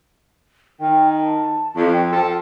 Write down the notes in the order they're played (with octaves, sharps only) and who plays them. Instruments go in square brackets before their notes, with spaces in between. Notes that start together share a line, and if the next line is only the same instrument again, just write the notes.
[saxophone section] D#3 [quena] G5
[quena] A5
[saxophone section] F2
[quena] G5
[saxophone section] F3 A4